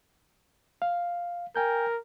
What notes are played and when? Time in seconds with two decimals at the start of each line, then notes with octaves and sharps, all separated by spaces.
0.82 F5
1.56 A#4 G5 G#5 G6